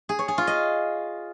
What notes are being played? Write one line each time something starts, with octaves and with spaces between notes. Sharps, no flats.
G#4
C#5
G#4
F4
D#5